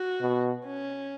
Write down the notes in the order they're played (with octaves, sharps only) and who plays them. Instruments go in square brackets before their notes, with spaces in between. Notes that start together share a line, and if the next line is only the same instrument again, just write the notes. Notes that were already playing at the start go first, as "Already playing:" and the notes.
Already playing: [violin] F#4
[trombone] B2
[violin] C#4